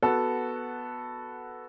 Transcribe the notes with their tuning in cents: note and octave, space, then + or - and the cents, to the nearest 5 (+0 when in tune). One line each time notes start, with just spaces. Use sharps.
B3 +0 F#4 -5 A4 +0